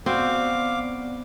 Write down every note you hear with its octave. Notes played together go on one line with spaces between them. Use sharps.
B3 C4 F#4 D5 F5 D6